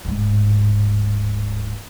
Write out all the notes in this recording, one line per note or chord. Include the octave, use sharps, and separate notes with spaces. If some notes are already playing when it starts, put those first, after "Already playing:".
D1 G#2